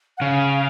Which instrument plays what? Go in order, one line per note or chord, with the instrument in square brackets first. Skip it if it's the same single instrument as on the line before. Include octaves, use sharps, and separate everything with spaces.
[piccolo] F#5
[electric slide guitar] C#3 [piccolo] F5